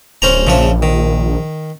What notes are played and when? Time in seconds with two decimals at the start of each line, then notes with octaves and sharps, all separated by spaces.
0.22 D1 C#4 C5 A#5
0.47 A#1 C#3 F3 E5
0.82 D#3